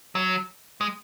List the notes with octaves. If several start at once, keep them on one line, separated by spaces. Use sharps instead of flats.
F#3
G#3